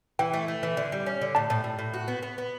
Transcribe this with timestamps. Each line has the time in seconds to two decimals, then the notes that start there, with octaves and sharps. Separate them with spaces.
0.19 E3 G5
0.33 A3
0.48 A3
0.63 E3
0.77 D3
0.92 G3
1.06 C#4
1.21 D3
1.35 A2 A5
1.50 A2
1.64 A2
1.78 A2
1.94 F#4
2.08 B3
2.22 B3
2.38 B3